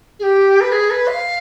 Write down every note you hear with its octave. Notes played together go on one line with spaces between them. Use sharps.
G#4
G4
B4
G#4
B4
F5